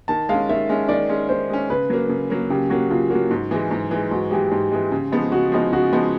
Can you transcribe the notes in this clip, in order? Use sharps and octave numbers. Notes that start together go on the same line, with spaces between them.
D#3 A5
G#3 C#4 F5
D#3 E5
G#3 C#4
D#3 D5
G#3 C#4
D#3 C5
G#3 C#4
C#3 B4
F#3 A#3
C#3
F#3 A#3
C#3 G4
F#3 A#3 F#4
C#3 F4
F#3 A#3 F#4
G#2
E3 G#3
G#2
E3 G#3
G#2 F#4
E3 G#3 G4
G#2
E3 G#3
C#3
F3 G#3 B3 D#4
C#3 F#4
F3 G#3 B3 D#4
C#3 F#4
F3 G#3 B3 D#4